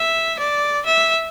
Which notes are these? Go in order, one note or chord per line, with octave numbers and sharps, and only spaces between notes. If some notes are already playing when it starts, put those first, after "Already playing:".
Already playing: E5
D5
E5